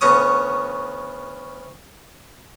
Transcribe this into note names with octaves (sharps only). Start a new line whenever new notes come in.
D2 B3 C#4 D#6